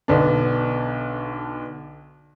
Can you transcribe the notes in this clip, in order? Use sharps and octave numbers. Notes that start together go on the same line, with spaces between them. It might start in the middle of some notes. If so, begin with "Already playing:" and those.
B1 D3 B3 D4